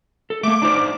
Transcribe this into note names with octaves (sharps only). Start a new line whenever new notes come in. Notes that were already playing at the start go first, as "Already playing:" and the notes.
A4
A3 A#3 D6
D4 D#4 C5